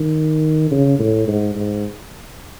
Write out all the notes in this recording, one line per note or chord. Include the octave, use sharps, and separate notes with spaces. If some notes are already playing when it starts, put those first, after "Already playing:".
Already playing: D#3
C#3
A2
G#2
G#2